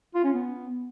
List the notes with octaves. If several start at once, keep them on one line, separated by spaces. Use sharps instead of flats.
F4
C#4
B3